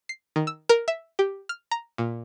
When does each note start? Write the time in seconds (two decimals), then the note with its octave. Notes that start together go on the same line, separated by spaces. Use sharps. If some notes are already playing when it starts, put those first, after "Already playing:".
0.09 C7
0.36 D#3
0.47 E6
0.69 A#4
0.88 E5
1.19 G4
1.49 F6
1.71 A#5
1.98 A#2